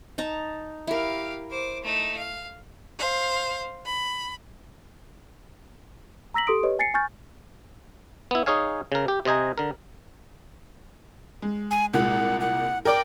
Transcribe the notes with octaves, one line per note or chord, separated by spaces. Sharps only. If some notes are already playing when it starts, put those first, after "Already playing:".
D#4 A5 A#5
E4 G4 A#4 F5
C5 D6
A3 D#4
F5
C5 F5
B5
A#5 E6 A#6 B6 F#7
G4 A4 C6 D#6 D7
G4 B4 C#5 D#5
G#5 A6 C7 C#7
G#5 C#6 F6 G6 A6
B3 E4
D#4 G#4 C#5 F5 G#5
C#3 A#4
G4
C3 C5 D#5 G#5 A#5
D3 A#4
G#3
G#5
C2 A#2 G#3 F#5
F#5
A#4 D5 G5 D6